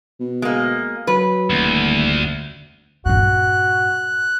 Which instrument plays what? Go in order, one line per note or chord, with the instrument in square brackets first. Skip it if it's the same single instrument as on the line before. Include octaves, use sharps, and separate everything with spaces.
[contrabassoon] B2
[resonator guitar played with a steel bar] G#3 A#3
[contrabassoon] F#3 [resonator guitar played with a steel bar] B4
[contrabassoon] D#1 [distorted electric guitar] D2
[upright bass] G2 A#2 [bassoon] F#4 [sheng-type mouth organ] F#6